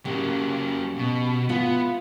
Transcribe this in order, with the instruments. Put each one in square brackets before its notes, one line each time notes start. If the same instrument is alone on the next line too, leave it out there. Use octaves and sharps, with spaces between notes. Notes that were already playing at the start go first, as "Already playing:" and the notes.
[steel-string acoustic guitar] C#3 G4 [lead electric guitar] F#3 A#3
[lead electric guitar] B2
[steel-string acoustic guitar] G#3 E4 F4 [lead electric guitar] B3